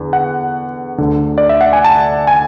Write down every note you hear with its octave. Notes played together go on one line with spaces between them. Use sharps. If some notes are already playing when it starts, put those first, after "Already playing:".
Already playing: E2 D3
F#5
D2 D3
D5
E5
F#5
G#5
A5
G#5